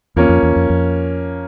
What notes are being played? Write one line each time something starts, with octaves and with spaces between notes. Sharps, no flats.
E2 F3 A#3 C#4
F2
E2
F2
F2